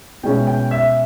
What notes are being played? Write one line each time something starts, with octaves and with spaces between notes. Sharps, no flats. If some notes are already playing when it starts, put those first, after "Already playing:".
B2 G#3 C#4 E4 G5
G5
E5